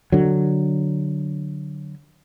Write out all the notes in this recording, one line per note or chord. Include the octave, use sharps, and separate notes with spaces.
D3 F#3